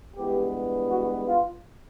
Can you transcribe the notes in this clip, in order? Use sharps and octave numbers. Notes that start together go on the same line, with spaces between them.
G2 E3 G#3 B3 G4
F#4
F4